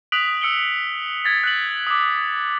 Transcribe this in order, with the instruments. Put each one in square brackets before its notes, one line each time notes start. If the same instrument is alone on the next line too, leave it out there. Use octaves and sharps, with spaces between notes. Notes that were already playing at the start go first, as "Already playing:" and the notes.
[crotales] D#6 F#6 B6 D7 F7 F#7
E6 C#7 D7 G7
G#6 A6 B6
F#6 B6 F#7
D6 D#6